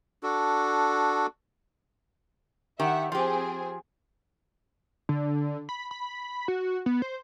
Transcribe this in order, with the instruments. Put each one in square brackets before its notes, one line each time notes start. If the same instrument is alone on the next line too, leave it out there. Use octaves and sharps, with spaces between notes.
[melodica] D4 F#4 A4
[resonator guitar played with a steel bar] D#3 G4 [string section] E5 F#5
[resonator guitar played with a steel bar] F3 G4 [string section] C4 G#4
[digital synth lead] D3
B5
B5
F#4
B3
C5